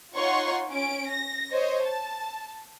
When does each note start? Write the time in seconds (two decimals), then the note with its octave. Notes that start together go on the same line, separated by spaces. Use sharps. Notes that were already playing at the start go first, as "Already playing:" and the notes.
0.16 D#4 F4 C#5 F#5 C6 C#6
0.69 C#4 D7
1.08 A#6
1.53 C5 C#5 D#5
1.83 A5